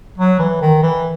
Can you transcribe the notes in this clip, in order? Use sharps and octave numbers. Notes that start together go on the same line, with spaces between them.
F#3
E3
D#3
E3